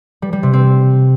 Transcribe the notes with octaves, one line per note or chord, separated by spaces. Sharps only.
G3
G3
C3
C4